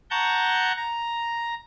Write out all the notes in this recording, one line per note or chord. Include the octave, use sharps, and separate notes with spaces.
F#5 A5 A#5 C#6 G6
A#5